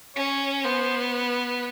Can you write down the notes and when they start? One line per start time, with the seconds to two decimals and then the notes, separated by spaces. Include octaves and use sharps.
0.16 C#4 C#5
0.64 B3 C5
1.13 B4